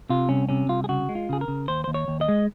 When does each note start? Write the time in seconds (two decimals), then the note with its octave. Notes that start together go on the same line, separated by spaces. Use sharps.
0.10 C3 F4
0.29 C2 C#4
0.49 C3 C#4
0.69 C2 F4
0.84 G#4
0.89 C#3 F#4
1.09 G#3
1.15 F4
1.29 C#3 G#4
1.41 A#4
1.48 C#3
1.68 D#2 C5
1.84 D#2 C5
1.94 C#5
2.08 D#2
2.21 D#5
2.28 G#3